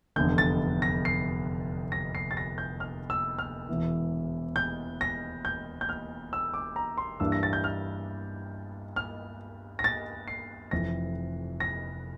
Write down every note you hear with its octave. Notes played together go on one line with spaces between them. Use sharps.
F1 E2 D3 G6
A6
A#6
C7
A#6
C7
A6
A#6
G6
F6
E6
F6
E1 E2 E3
G6
A#6
G6
G6
F6
E6
D6
A#5
C6
G2 E3 A#3 D4 E6
A#6
A6
G6
F6
F6
A#6
A6
C7
F1 F2 E3 A#6
A#6